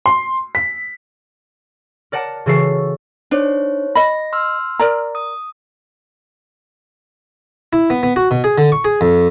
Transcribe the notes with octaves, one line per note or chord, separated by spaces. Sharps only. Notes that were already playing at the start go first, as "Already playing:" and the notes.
C6
B6
A#4 D5 F#5 A5
C#3 E3 F#4 A4 C7
D4 D#4 C5 C#5
D#5 B5 A#6
C6 E6 F6
A#4 D5 A#5
D#6
E4
B3
B3
F#4
B2
G#4
D3
C#6
G#4
F2